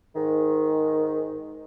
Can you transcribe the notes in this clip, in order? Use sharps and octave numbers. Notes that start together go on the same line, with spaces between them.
G#2 D#3